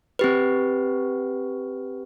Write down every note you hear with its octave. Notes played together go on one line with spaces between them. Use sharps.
C4 G4 B4